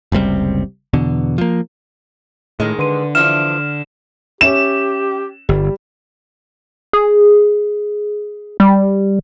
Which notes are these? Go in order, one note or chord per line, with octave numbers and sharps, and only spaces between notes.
F#1 C#2 C3 G3
E2 B2 D3
F3 A#3
A2 D#3 G#3
D3 B4 C6 D#7
E3 F3 D4 F6 E7
C#4 G4 E5 E7
G1 G3
G#4
G3